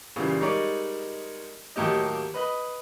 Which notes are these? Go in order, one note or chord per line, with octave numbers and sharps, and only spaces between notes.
A#2 C#3 E3 G3
G3 G#3 D#4 A#4 C#5 D5
D#2 A2 F#3 A#3 G4 D#5
B4 D#5 B5